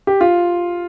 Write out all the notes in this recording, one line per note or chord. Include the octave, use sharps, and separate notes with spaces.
G4
F4